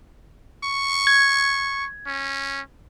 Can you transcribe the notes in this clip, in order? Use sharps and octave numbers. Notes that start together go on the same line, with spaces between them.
C#6
G#6
C#4